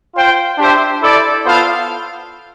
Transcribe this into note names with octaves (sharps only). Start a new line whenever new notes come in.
F4 C5 G5
D4 G4 C5 E5
E4 A4 D5
B3 F4 A4 C5 F5